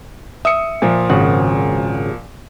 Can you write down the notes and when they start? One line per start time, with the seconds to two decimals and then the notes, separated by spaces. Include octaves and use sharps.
0.45 E5 D#6 C#7
0.82 A#2 F3
1.10 G#1 C#3 F#5